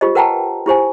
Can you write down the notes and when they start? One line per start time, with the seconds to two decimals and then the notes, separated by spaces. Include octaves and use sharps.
0.01 F4 G4 C5 D#5
0.15 A#4 B4 F#5 G5 A5 A#5
0.66 E4 G4 C5 G#5